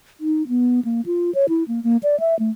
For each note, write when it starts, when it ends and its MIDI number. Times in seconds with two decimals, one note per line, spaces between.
0.20 0.47 63
0.48 0.80 59
0.85 1.01 58
1.06 1.33 65
1.35 1.46 73
1.49 1.64 64
1.68 1.82 58
1.83 1.97 58
2.03 2.19 74
2.20 2.38 76
2.39 2.51 57